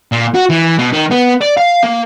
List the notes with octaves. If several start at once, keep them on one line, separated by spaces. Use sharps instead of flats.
A#2
F#4
E3
B2
D#3
B3
D5
F5
A#3